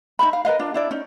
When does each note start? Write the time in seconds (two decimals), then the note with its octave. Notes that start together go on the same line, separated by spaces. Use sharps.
0.19 D#4 C5 E5 B5
0.33 F5
0.45 A#4 B4 D#5 F5
0.59 D4 F4
0.74 D4 E4 D5
0.91 C#4 D#4